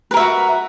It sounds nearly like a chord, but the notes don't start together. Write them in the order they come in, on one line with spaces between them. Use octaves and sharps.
B4 A#4 E5 F#4